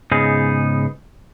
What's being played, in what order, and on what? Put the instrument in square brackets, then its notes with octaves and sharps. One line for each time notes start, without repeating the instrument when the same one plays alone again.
[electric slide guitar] G#2 C#3 B3 D#4 G#4